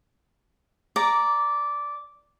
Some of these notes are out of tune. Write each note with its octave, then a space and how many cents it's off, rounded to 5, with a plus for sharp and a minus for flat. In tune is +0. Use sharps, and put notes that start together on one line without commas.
D5 -10 A#5 +0 D6 -20